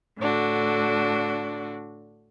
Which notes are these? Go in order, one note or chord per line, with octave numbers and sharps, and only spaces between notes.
A2 D3 D4 F#4